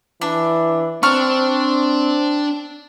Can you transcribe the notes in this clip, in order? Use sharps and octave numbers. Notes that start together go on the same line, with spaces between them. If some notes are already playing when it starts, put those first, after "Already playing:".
E3 D4
C4 D4 C#6 F6